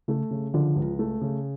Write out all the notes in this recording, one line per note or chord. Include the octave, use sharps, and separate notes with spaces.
C#3 A3
C#3
D3 F3
C#2
A3
C#3